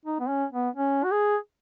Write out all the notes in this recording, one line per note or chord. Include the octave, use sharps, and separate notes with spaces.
D#4
B3
C#4
B3
C#4
F#4
G#4